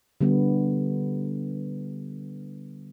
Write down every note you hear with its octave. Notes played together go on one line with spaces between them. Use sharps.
D3 G3 B3